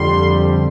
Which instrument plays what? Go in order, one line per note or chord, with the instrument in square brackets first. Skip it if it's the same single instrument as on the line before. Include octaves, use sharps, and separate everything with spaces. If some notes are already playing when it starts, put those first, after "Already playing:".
Already playing: [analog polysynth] F2 D3 G3 C6